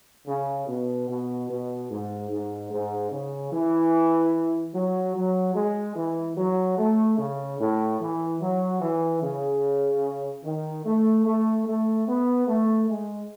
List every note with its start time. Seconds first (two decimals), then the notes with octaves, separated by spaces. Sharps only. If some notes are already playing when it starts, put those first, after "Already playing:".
0.27 C#3
0.67 B2
1.08 B2
1.49 B2
1.90 G#2
2.30 G#2
2.71 G#2
3.11 C#3
3.52 E3
4.74 F#3
5.15 F#3
5.55 G#3
5.96 E3
6.37 F#3
6.77 A3
7.18 C#3
7.59 A2
7.99 E3
8.40 F#3
8.81 E3
9.22 C#3
10.44 D#3
10.85 A3
11.26 A3
11.66 A3
12.07 B3
12.47 A3
12.88 G#3